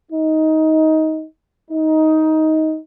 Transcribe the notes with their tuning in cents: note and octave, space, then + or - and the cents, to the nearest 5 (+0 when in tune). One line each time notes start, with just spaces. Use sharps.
D#4 +15
D#4 +15